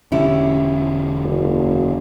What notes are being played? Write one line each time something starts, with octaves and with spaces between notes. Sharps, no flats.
E1 D3 C#4 D4 E4 G4
F#1